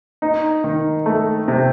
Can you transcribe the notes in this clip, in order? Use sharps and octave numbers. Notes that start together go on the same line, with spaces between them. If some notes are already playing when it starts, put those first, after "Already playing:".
D#4
D#3
A3
C3